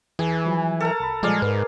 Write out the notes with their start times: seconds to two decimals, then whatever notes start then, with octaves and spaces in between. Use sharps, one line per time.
0.19 E2 E3 G#4
0.45 F3 F#3
0.80 A4 A#4 A#5
1.00 C2 B5
1.23 A#2 F3 G3 G#3 G#4 D5 F5
1.42 G#2 A#4 B4